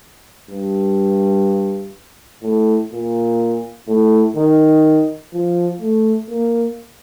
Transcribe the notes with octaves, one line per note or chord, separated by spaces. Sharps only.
G2
A2
A#2
A2
D#3
F3
A3
A#3